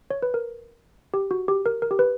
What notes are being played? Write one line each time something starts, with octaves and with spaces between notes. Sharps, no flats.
C#5
B4
A#4
G4
F#4
G4
A#4
A#4
G4
B4